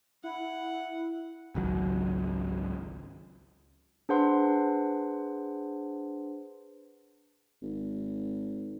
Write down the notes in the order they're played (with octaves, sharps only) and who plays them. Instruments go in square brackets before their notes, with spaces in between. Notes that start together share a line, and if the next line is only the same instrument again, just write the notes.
[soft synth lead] E4 [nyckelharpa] F#5
[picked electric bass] G#1 C#2 F#3
[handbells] D4 G#4 B4 C5 F#5 C6
[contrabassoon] G#1